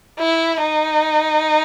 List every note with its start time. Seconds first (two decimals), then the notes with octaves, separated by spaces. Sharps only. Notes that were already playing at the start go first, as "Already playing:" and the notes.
0.19 E4
0.61 D#4